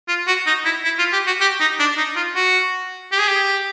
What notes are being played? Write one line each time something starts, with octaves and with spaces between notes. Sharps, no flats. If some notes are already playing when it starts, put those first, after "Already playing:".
F4
F#4
D#4
E4
E4
F4
G4
F#4
G4
D#4
D4
D#4
F4
F#4
G4
G#4
G4